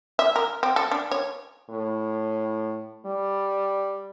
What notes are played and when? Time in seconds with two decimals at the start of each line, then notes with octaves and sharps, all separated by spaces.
0.19 E5
0.36 A#4
0.63 C4
0.76 A4
0.91 D4
1.11 C#5
1.70 A2
3.06 G3